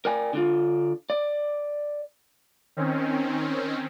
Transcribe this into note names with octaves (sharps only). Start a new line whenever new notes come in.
A#4 D5 G5 G#5
D3 D4 F4
D5
D#3 C4 C#4